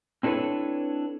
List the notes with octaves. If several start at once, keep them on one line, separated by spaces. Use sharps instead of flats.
C4 D4 E4 A4 B4 C#5